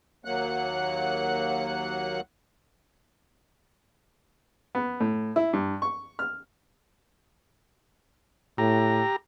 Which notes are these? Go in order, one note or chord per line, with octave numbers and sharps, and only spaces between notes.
D#2 F#3 A#3 F#5 F#6
B3
A2
E4
G2
C#6
F6
A2 G4 A#5